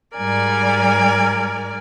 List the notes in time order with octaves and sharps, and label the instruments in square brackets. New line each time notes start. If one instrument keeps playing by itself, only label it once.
[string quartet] G#2 G3 A#4 D5 G#5